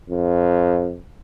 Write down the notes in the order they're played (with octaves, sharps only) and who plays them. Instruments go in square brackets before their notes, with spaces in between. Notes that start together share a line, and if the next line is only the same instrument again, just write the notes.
[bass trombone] F2